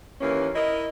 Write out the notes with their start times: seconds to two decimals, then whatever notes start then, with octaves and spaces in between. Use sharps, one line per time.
0.20 D#2 E3 A#3 C#4
0.54 E4 A#4 D#5